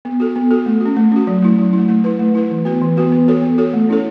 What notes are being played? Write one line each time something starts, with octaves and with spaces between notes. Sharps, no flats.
B3
F#4 A4
B3
F#4 A4
A3
C#4 F#4
A3
C#4 F#4
F#3
A3 E4
F#3
E4
A3
A3
E4 B4
A3
E4 B4
E3
B3 F#4 B4
E3
B3 F#4 B4
B3
F#4 A4 C#5
B3
F#4 A4 C#5
A3
C#4 E4 A4 C#5